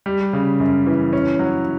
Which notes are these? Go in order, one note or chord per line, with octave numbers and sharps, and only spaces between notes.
G3
C#3
F#2
E3
C#4
F#3